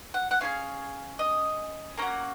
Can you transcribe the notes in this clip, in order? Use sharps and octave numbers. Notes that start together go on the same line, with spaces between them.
F#5
F#5
C#4 F4 G#4 F5
D#5
A#3 C#4 F#4 A#5